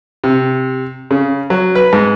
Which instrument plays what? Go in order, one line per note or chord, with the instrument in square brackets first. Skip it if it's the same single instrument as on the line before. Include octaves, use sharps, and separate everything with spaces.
[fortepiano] C3
C#3
F#3
B4
G#2